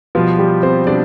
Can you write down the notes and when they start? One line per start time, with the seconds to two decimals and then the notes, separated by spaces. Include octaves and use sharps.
0.15 B2 F3 G3 F4
0.39 G3 G4
0.63 C4 C5
0.87 B2 G3 D4 D5